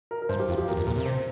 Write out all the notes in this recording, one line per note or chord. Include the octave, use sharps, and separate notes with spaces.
A#4
A#4
G2 C5
G4
F2 F4
G4
E2 A#4
F2
A#2 A#4
C3
C5